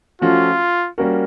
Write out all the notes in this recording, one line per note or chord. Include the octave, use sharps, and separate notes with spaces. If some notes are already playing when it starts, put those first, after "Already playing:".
F3 A3 C#4 F4 F#4
G3 A#3 C#4 F#4 A#4